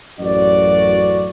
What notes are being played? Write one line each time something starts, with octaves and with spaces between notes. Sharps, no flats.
A1 F#2 F#4 D5